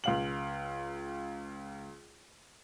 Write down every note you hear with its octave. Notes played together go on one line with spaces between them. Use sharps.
C#2 F5 F#7